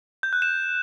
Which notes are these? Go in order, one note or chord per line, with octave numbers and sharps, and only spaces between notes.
G6
F#6
E7